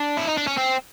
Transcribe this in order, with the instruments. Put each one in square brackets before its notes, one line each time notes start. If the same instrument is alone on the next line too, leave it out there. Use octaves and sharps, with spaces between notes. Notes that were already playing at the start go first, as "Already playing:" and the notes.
Already playing: [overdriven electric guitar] D4
E4
D#4
D4
C#4
C4